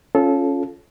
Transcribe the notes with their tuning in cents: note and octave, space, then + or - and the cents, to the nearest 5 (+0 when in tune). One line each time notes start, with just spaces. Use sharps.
C#4 +0 F4 +0 A4 -20